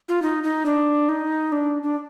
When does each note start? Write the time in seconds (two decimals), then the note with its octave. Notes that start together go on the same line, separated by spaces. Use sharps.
0.09 F4
0.22 D#4
0.43 D#4
0.66 D4
1.09 D#4
1.52 D4
1.83 D4